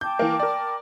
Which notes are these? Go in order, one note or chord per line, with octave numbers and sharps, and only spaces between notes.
G5 A5 D6 G6
E3 A#3
A#4 D5